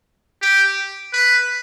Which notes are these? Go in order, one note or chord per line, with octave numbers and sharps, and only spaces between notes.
G4
B4